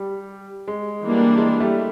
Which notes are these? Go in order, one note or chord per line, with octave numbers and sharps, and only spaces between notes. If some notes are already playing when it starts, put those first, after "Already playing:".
Already playing: G3
G#3
E3 G3 A#3 D4
G#3
G3 A3